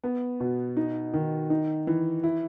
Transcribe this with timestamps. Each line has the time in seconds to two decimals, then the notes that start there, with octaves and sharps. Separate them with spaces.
0.04 B3
0.40 B2
0.77 D#4
1.14 D#3
1.50 D#4
1.87 E3
2.24 E4